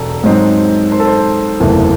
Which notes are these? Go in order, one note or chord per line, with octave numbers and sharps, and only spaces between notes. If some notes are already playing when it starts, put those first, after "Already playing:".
Already playing: E1 A4
G#2 F#3 C4 D#4
C5
A4
C5
F#1 E2 C3 E3 A3